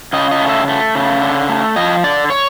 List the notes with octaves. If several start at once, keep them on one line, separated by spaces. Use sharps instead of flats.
C#3 D#5
D#5
A3
E5
A3
C#3
D3
A3
F3 D#5
D3 D5
C#5